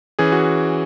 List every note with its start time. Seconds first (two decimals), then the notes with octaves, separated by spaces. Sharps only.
0.19 E3 C#4 G#4
0.32 F#4